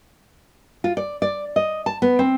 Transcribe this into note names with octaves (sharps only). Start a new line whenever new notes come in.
F4
D5
D5
D#5
A5
B3
C4